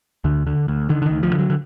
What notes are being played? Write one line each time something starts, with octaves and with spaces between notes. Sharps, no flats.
D2 D3
D3
D2
D3 D#3
D3
D#3
D2
F3
D3
F#3
D3